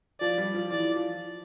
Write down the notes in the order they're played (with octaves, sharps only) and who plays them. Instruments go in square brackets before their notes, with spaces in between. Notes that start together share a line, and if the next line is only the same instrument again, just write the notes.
[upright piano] F3 [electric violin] D5
[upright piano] G3
F3
[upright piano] E3 [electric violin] D5
[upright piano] F3